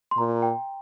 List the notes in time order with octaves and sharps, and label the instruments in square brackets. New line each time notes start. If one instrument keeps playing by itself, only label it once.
[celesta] C6
[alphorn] A#2 [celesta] A#5
[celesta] G5